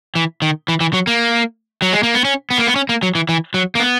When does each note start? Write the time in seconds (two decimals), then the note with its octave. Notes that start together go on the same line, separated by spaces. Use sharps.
0.15 E3
0.42 D#3
0.68 E3
0.80 E3
0.93 F#3
1.07 A#3
1.82 F#3
1.93 G#3
2.03 A#3
2.14 B3
2.25 C#4
2.50 B3
2.58 A#3
2.67 B3
2.76 C#4
2.89 A#3
3.03 F#3
3.15 E3
3.29 E3
3.54 F#3
3.75 A#3
3.80 B3